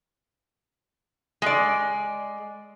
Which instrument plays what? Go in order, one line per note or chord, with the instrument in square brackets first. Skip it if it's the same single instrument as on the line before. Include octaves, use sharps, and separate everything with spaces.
[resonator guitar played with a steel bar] G#3 D5